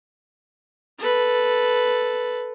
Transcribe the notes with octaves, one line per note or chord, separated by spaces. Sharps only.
A4 B4